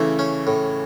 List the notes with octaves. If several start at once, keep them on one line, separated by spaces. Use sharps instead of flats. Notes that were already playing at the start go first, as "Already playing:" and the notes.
Already playing: C#3 E3 A3
C#4
A2